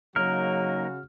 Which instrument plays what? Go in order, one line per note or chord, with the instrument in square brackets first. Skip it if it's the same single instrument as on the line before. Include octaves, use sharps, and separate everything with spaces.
[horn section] C#3 F#4 [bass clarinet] F#3 [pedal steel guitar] A#3 D#4 A#4 [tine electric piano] F6